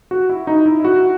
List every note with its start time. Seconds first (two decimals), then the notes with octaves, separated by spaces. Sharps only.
0.11 F#4
0.29 E4
0.47 D#4
0.66 E4
0.80 E4
0.84 F#4